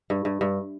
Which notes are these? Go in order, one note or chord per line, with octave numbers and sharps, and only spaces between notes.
G2
G2
G2